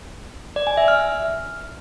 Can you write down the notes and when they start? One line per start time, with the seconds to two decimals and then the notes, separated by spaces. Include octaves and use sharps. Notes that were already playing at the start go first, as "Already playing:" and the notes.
0.56 D5
0.67 G#5
0.77 E5
0.88 F6